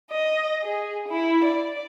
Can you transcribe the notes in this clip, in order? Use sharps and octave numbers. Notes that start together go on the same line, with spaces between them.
D#5
G#4
E4
D5